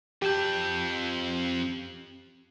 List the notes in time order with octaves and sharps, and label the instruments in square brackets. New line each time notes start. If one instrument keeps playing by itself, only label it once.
[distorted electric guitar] F2 A5 [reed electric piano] G4 G6